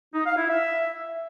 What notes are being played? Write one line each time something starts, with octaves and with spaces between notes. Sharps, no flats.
D#4
F5
E4
E5